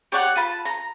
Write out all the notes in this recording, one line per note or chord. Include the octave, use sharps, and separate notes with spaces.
G4 C#5 D5 F#5
F4 A5 B5
A#5